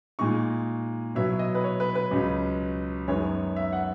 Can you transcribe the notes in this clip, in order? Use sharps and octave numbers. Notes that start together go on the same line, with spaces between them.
A#2 G#3 D#4 C#6
B2 F#3 B3 E4 E5
D#5
B4
C#5
B4
B4
C#2 C#3 F#3
F#2 D#3 G#3 B3 C#5
E5
F#5